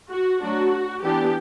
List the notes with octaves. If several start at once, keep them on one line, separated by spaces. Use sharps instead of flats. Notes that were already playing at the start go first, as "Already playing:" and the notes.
F#4
F#3 A3 D4 F#4
E3 B3 D4 G4